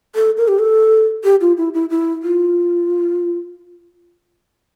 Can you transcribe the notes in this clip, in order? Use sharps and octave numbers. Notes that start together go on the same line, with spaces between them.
A4
A#4
G4
A4
G4
F4
E4
E4
E4
F4